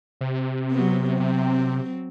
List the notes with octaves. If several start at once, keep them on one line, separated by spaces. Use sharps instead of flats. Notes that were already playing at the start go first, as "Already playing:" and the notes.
C3
F#3 B3
C3 F#3 C4